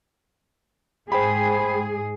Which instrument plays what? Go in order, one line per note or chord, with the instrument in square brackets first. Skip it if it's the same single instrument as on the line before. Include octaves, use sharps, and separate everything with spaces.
[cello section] G#2 G#4 [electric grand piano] C5 G5 B5